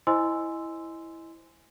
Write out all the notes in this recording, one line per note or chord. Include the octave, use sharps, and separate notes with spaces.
E4 C5 D#5 G#5 C6 E6